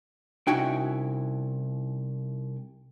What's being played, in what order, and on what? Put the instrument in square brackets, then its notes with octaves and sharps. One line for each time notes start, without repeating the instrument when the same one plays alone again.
[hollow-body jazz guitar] C2 C#4 D#4 E4 F#4 G5